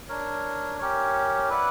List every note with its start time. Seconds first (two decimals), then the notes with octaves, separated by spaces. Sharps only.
0.09 D4 A#4 C#5
0.79 C#4 G4 A#4 C#5
1.49 E4 B4 D5 F#5